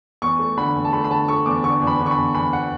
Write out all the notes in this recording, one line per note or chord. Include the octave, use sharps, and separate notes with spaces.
E2 C#6
A3
D3 B5
E2
A5
A3 B5
B5
D3 A5
A3 C#6
E2 D6
D3 C#6
E2
B5
D3
C#6
B5
E2
E2 B5
F#5